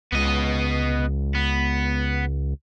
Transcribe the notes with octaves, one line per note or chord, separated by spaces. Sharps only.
C#2 B3 D#5
B3